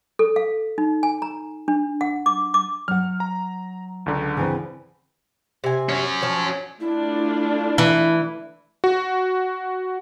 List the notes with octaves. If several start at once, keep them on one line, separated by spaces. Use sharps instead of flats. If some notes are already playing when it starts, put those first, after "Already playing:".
A4
F5
D#4
G#5
A#5
D4
F#5
D6
D6
F#3 F#5 F6
A#5
C#2 D3
C#3 E3 C4
C3 G#5
C#4 F#4
F3 C#5
A3 D4 E4 F4
E3
F#4